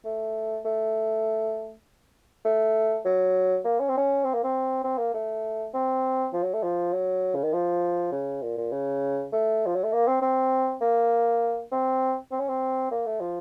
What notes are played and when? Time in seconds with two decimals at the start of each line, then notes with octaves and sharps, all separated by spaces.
0.05 A3
0.65 A3
2.45 A3
3.05 F#3
3.65 A#3
3.80 C#4
3.89 C4
3.97 C#4
4.24 C4
4.34 A#3
4.44 C4
4.84 C4
4.98 A#3
5.14 A3
5.74 C4
6.33 F3
6.43 F#3
6.54 A3
6.63 F3
6.93 F#3
7.35 C#3
7.43 D#3
7.53 F3
8.12 C#3
8.43 A#2
8.57 A#2
8.72 C#3
9.33 A3
9.66 F3
9.75 F#3
9.84 A3
9.93 A#3
10.08 C4
10.22 C4
10.81 A#3
11.72 C4
12.32 C4
12.40 C#4
12.49 C4
12.91 A#3
13.06 A3
13.20 F3